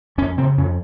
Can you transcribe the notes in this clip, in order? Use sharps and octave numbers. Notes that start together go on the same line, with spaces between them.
F2 C#4
C#3 C4
F2 C#4